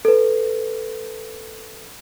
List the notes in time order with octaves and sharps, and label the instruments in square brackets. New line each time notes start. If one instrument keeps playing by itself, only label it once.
[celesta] A4 B4